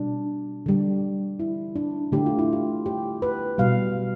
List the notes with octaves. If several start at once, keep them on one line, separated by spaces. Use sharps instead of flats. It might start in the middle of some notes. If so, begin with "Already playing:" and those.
Already playing: B2 G3 D4
D3 G3
E4
D4
D3 A3 G4
F4
E4
F4
G4
B4
B2 G3 F5